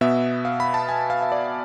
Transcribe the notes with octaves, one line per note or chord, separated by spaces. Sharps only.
B2 B3 E5
F5
B5
A5
G#5
F5
E5
D5